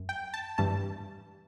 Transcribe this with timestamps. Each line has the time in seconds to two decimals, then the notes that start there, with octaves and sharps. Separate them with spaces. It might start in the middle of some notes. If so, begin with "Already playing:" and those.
Already playing: F#2
0.09 G5
0.34 A5
0.58 G2 E3 G3 A5